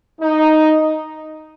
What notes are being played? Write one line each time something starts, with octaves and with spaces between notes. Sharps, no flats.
D#4